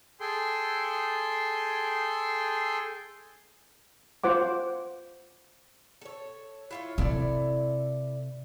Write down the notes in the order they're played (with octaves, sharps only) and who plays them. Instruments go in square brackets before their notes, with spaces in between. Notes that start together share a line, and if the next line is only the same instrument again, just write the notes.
[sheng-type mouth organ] G#4 A4 G5 C6
[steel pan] F4 C5 F#5 D6
[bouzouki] A4 C#5
E4 F4 C#5
[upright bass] C3 [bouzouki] E4 A4 D5